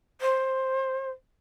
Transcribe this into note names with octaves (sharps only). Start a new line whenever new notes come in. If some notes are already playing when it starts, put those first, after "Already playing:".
C5